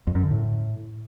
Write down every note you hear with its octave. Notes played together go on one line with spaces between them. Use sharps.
F2
F#2
D3
A2